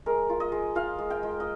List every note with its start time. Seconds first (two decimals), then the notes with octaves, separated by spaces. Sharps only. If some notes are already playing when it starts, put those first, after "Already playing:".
0.06 G#3 A#4
0.29 F4
0.40 D#5
0.52 G#3
0.75 F4 F5
0.98 G#3
1.10 G5
1.23 G#3
1.40 D#5